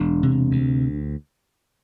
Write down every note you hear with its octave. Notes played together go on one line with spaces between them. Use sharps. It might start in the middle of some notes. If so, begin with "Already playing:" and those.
Already playing: E1 D4
C3
D2